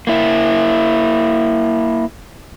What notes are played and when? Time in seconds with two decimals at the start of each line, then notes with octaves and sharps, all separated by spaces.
0.07 A#3 E4